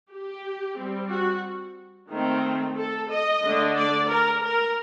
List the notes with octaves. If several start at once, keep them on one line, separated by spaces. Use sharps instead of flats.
G4
G3 C4
F#4
D#3 A3 C4
A4
D#5
D3 A3 D4
D5
A#4
A#4